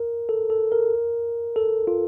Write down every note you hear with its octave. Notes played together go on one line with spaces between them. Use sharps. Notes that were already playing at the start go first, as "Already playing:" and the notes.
Already playing: A#4
A4
A4
A#4
A4
F4